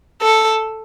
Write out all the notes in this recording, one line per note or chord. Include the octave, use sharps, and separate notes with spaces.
A4